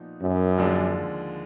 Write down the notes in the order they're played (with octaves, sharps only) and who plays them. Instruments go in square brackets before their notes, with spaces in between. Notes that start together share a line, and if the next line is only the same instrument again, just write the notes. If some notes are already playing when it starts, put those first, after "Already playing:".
Already playing: [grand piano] A#2 F3 B3 D#4
[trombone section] F#2
[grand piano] D#2 D3 F3 G#3 D4